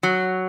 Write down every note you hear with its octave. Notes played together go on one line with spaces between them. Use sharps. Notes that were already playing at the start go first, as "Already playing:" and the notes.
F#3